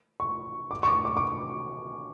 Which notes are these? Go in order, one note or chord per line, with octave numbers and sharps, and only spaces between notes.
C#6
D6
C#6
D6
D6
D6